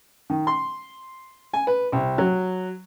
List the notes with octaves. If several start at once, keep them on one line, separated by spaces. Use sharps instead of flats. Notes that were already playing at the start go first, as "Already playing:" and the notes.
D#3
C6
G#5
B4
C2
F#3